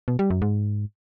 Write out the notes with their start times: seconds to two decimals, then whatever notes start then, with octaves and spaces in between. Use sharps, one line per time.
0.08 B2
0.19 G3
0.30 F#2
0.42 G#2